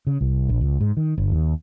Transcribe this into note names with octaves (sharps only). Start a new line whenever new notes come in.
C#3
C2
A#1
C#2
G#2
D#3
G1
D#2